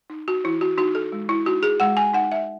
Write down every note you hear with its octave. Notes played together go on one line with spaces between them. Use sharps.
D#4
F#4
E3 E4
F#4
D#4 F#4
A4
G#3
E4
D#4 F#4
G#4
G#3 F#5
G#5
D#4 F#5
E5